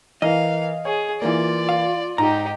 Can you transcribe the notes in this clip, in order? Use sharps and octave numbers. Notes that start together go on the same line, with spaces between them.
E3 A#4 D#5 F5
G#4 C#5
E3 A#3 F4 D5
F5
G#2 D#4 G4 A#5